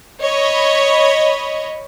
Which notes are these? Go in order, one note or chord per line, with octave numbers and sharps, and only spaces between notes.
C#5 D#5 B5